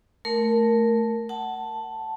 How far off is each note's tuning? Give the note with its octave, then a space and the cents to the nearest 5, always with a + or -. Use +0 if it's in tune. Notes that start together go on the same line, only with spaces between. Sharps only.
A3 +0 A#4 +0
F#5 +20 A5 +0